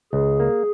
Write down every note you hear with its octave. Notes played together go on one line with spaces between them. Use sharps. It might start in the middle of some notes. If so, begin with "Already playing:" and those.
C#2 G#4
A#3